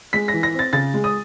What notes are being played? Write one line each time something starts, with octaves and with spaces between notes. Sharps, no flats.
G#3 B6
A#6
E3
A#6
C4 A6
C#3 A6
G#3
D#6